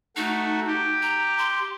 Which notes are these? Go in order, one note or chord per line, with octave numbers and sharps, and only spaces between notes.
A3 D#4 F#4
G4
A#5
C6